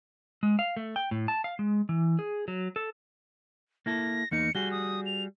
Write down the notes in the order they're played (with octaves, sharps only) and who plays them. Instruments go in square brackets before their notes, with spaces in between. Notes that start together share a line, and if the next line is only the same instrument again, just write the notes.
[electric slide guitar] G#3
F5
A3
G5
A2
A5
F5
G#3
E3
G#4
F#3
A4
[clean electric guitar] A#3 E4 A4 [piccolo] A#6
[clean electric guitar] E2 A#3 D#4 [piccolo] C#7
[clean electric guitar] G3 F#4 G#4 [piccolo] G7
[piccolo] D#6
F7